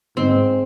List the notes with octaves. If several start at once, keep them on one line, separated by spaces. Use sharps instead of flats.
G#2 G#3 C4